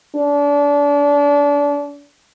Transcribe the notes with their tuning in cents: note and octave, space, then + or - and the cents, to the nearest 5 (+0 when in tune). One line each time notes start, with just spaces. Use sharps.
D4 -30